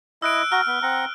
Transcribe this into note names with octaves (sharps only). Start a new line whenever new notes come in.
E4 D#5 E6 F#6 D7
F#4 A#5 F6
B3
C4 F#5 A#5